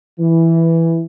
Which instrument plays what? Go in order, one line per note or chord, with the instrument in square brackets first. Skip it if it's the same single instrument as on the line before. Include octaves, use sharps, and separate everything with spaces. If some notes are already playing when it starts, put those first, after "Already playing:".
[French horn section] E3